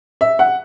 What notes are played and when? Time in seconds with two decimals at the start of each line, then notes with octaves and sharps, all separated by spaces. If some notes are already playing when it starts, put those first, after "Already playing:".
0.21 E5
0.39 F#5